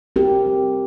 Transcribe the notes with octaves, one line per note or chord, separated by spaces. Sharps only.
C4 G4 A#4
G3